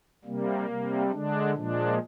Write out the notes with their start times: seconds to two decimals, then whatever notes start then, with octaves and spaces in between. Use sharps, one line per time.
0.25 C3 G3 A#3
0.68 C3 G3
1.11 D3 G#3 D4
1.55 A#2 F3 G#3 D4